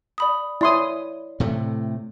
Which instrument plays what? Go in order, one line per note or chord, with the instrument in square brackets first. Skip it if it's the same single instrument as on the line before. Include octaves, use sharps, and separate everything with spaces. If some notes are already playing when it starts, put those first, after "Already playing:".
[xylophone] D5 B5 D#6
[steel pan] E4 C6 D#6 [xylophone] C#5 D5
[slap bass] A2 C3 A3